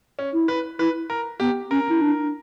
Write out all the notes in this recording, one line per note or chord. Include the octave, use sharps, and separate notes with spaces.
C#4
E4
B4
E4 B4
A#4
B3 G4
C#4 A#4
E4
D4